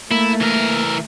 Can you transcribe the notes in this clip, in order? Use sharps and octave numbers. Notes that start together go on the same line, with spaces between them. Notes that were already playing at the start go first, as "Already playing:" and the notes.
A3 A#3 E4
E3 A#4